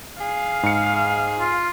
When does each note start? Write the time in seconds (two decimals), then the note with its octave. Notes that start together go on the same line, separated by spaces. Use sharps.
0.20 G#4 F5
0.63 G#2 C#7
1.39 F4